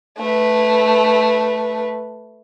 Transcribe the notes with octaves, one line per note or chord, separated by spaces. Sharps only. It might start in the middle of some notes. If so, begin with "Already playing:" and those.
A3 B4